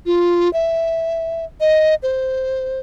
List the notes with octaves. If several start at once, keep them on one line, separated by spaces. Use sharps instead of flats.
F4
E5
D#5
C5